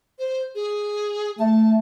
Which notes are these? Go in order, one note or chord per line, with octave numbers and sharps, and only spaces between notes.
C5
G#4
A3 A5